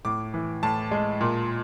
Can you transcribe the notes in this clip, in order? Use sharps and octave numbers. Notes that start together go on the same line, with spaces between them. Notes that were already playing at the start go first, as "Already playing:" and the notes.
A2 D6
E3
A2 A5
G#3
A#2